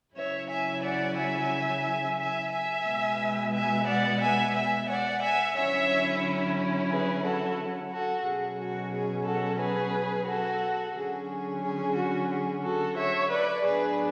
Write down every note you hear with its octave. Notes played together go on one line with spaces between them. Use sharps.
C#3 F#3 C#4 E4 C#5 E5
E5 G#5
D5 F#5
E5 G#5
E5 G#5
E5 G#5
B2 G#3 B3
E5 G#5
D5 F#5
E5 G#5
E5 G#5
D5 F#5
E5 G#5
D3 F#3 C#4 E4 C#5 E5
G#4 B4
F#4 A4
F#4 A4
B2 F#3 C#4 G#4
F#4
G#4
F#4 A4
G#4 B4
F#4 A4
D3 F#3 C#4 G#4
G#4
G#4
F#4
G#4
F#4 A4
C#5 E5
B4 D5
A2 F#3 B3 D4 G#4 B4